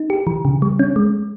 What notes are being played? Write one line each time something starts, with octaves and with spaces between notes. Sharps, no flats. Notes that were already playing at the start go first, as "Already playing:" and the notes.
Already playing: D#4
G4
E3
C#3
G3
C#4
G#3